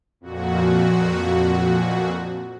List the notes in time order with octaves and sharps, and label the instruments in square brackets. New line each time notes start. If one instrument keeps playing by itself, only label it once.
[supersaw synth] F2 A#2 F#4